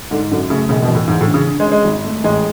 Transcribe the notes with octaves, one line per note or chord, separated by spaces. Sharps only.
G#2 D3
F#2 D3
C#3 A3
E1 C#3
B2
E2
A2
E2 G#2
A2
D3
C#3
D3
G#3
C#4
G#3
G#1
A3
A1 G#3